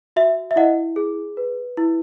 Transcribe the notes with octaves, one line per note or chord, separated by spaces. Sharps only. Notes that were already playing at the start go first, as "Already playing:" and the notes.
F#4 E5
E5
E4 D#5 F#5
G#4
B4
E4